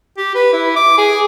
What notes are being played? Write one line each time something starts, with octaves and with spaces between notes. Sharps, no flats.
G4
B4
E4
D6
G#4